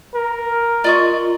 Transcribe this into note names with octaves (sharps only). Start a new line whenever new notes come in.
A#4
F4 D5 D#5 C#6